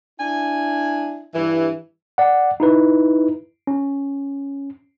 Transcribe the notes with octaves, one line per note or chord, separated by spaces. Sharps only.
D4 E4 G#5
G2 E3
D5 F#5
D#4 E4 B4
C#4